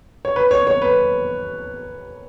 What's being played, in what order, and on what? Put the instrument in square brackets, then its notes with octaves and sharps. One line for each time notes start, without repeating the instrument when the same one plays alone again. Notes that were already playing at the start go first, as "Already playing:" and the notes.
[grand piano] C#5
B4
C#5
C#5
B4